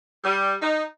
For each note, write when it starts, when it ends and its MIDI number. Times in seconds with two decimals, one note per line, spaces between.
0.23 0.54 55
0.61 0.83 63